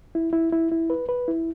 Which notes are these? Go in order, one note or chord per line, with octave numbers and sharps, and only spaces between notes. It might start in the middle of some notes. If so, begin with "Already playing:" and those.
E4
E4
E4
E4
B4
B4
E4